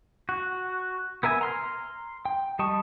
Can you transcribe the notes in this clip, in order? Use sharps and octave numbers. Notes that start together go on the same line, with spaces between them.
F#4
B3 A#4 E5 G#5
A#5 C6 F6
G5
G3 D#5 A5 C#6